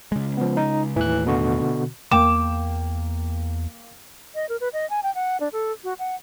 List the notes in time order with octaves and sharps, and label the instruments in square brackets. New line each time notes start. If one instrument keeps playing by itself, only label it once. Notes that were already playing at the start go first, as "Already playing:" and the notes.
[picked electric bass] C#3 G#3
[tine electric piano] F3 B3
D#4
[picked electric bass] D#2 A2 [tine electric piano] E3 F#6
[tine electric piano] B2 D3 F#4
[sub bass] E2 [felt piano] A#3 G5 E7 [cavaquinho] D6
[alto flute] D#5
A#4
B4
D#5
G#5
G5
F#5
D4
A4
F#4
F#5